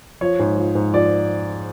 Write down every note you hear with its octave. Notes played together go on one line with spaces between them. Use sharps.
F3 C#5
G#2
F3
G#2
F3 D5